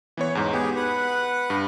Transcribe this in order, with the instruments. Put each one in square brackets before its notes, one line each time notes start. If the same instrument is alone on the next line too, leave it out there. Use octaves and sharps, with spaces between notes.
[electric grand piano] E3 B3 C#5
E2 G#2
[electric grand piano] B3 [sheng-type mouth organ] G4 G#4
[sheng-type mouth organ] B4 F#5
[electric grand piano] G2